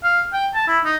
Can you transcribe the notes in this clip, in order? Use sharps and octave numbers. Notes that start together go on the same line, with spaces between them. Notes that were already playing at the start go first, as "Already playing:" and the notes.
F5
G5
A5
E4
D#4